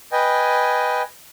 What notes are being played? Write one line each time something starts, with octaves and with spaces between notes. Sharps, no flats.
B4 D#5 G5 G#5